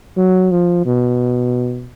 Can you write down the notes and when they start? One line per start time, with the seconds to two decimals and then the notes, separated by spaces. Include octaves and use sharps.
0.17 F#3
0.51 F3
0.86 B2